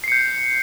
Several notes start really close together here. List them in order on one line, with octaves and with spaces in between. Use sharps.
C7 C#7 G6